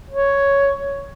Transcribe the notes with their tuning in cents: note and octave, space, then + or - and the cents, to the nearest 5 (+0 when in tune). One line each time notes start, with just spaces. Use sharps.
C#5 +5